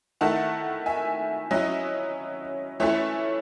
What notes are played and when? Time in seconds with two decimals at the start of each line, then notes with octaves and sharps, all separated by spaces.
0.21 D#3 A3 E4 F#5 A5
0.86 E5 G#5
1.51 F#3 C#4 E4 D#5
2.80 E3 A3 C#4 E4 C#5 E5